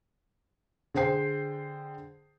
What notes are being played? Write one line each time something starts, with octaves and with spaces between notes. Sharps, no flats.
D3 G#4 C5 G5 C7